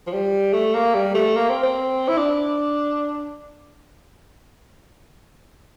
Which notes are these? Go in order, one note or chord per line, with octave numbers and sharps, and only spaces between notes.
F3
G3
A3
A#3
G3
A3
A#3
C4
C4
E4
D4